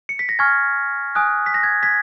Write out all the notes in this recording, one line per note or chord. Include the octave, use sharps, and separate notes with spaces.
C#7
B6
A#6
G#5 C#6 F6 G#6
G#5 D#6 F#6
B6
A#6
G#6
G#6 B6